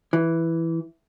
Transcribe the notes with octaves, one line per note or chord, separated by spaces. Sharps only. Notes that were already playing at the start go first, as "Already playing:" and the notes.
E3